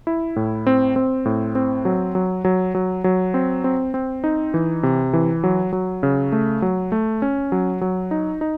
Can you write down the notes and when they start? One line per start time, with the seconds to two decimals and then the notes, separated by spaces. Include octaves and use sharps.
0.07 E4
0.36 A2
0.67 C4
0.96 C4
1.25 A2
1.55 C4
1.85 F#3
2.15 F#3
2.45 F#3
2.75 F#3
3.04 F#3
3.34 C4
3.64 C4
3.94 C4
4.24 D#4
4.54 E3
4.83 C3
5.13 E3
5.44 F#3
5.73 F#3
6.03 C#3
6.32 A3
6.62 F#3
6.92 A3
7.22 C#4
7.52 F#3
7.81 F#3
8.11 D#4
8.41 D#4